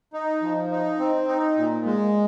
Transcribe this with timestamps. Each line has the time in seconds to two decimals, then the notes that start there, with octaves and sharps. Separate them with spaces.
0.13 D#4
0.42 F3
0.71 D#4
0.99 C4
1.28 D#4
1.57 A#2
1.85 G#3